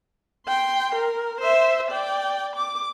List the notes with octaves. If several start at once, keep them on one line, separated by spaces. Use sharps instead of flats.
G5 C6
A#4
C5 E5
D5 G5
D6